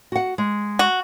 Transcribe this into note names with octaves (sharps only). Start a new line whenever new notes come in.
F#4 F#5
G#3
F#4